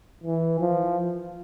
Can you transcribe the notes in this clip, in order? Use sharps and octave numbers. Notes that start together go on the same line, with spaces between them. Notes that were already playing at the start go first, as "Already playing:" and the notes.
E3
F3